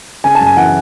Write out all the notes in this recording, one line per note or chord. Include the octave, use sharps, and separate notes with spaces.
C#3 G#5
A5
F#2
G#5
E3 F#5